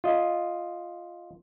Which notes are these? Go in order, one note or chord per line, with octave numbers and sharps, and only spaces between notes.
F4 D#5